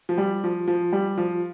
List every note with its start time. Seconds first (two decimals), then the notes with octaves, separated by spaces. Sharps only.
0.09 F3
0.18 G3
0.44 F3
0.68 F3
0.92 G3
1.18 F3